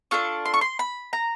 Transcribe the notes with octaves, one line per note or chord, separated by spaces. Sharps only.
D4 F4 A4 C#6
C6
C#6
C6
B5
A#5